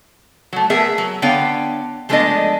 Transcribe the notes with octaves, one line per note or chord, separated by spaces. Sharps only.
F#3 A3
A3 B3 G#4 A#4 E5
F#3
D3 B3 C#5 F5 G5
F3 G#3 A3 B3 D4 D#5